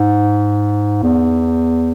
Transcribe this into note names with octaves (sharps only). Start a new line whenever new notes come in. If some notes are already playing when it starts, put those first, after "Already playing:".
Already playing: G#2
E2